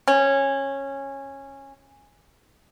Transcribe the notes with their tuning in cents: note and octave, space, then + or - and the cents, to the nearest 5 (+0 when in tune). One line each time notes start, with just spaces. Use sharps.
C#4 -15